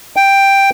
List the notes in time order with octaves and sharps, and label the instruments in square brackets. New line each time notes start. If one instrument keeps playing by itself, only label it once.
[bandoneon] G5